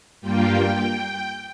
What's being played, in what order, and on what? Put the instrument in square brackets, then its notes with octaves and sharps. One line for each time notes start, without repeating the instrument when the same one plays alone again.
[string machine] G2 G3 A#3 F4 G5